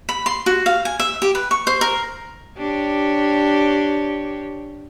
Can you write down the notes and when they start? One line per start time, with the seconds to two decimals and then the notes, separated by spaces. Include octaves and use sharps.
0.09 B5
0.26 C6
0.46 F#4
0.66 F5
0.85 G#5
1.00 E5
1.22 G4
1.35 B4
1.51 C#6
1.67 C5
1.81 A#4
2.58 D4 G4 C#5